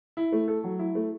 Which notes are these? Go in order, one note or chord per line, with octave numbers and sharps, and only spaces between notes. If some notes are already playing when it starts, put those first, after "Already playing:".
E4
A3
A4
F#3
E4
A3